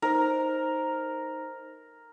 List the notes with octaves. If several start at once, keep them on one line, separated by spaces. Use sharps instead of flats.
D#4 A#4 C5